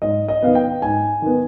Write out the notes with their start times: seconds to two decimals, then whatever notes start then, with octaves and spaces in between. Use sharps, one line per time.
0.02 G#2 D#5
0.28 D#5
0.42 D#3 B3 F5
0.55 G5
0.82 G#2 G#5
1.22 D#3 B3